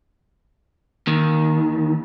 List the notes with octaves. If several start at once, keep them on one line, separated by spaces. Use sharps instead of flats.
D#2 D#3